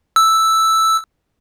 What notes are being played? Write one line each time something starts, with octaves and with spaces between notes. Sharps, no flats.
E6